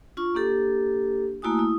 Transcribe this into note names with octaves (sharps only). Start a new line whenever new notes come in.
D4 F4 C#6
A#3 D4 G4 A4
A3 A#3 E4 F#4 G#5 D#6
E4 D#6